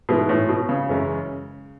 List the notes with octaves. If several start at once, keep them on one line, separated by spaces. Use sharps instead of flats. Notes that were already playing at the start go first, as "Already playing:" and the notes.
G#2 B2 E3 G#3 B3 E4
A2
B2
C#3
F#2 E3 G#3 C#4 E4